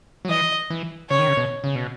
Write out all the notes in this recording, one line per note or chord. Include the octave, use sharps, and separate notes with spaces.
F#3
E3 D#5
E3
C#3 C#5
D#3
C#3
B2
C#3
B2